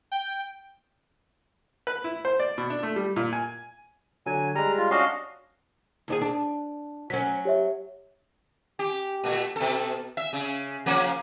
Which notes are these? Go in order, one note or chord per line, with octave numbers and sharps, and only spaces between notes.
G5
B4
E4
C5
D5
B2
D4
A3
G3
A#2
G#5
D3 F#3 G#5
G3 G#3 A#5
F4
C#4 D4 F#4 D#5 F5
D#2 D4 G#4
D4
F#3 C#4 B6
G4 C#5 E5
G4
A#2 A3
B2 A4
E5
C#3
C#3 F3 A#3